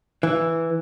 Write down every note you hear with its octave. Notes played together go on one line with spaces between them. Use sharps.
E3